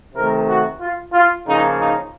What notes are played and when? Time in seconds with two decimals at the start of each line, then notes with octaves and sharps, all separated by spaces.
0.14 C3 D#3 A3 A#4
0.47 F#4
0.80 F4
1.13 F4
1.46 C#3 F3 A#3 D#4
1.78 D#4